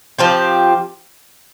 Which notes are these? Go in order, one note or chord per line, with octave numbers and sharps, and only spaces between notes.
F3 C4 G4